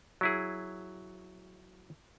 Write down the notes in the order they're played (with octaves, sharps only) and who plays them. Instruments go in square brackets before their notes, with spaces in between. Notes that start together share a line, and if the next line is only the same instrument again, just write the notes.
[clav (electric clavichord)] F#3 E4 G#4